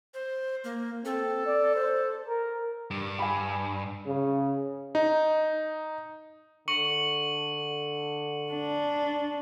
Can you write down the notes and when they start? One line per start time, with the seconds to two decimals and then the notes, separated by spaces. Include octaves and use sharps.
0.14 C5
0.64 A#3
1.05 C4 A4
1.47 D5
1.75 C5
2.28 A#4
2.91 G2
3.19 G#5 B5
4.06 C#3
4.95 D#4
6.68 D3 C#6 C#7 F#7
8.53 D4